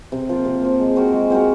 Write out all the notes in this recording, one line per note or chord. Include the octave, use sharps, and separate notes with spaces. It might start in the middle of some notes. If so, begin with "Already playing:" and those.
C3
F3 A#3
C3
F3 A#3
G#3
C4 F#4 A#4
G#3
C4 F#4 A#4